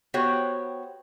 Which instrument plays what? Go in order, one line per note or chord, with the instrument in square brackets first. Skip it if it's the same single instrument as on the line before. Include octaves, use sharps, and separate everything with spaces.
[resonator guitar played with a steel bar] B3 F#4 G4 C5 C#5 G5